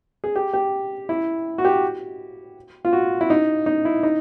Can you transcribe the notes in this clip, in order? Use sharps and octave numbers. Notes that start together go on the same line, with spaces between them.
G#4
G4
G4
E4
F#4
G4
F4
F#4
E4
D#4
D#4
E4
D#4